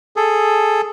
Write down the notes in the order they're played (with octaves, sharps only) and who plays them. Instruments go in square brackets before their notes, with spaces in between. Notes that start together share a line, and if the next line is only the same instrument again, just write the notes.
[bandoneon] G#4 A4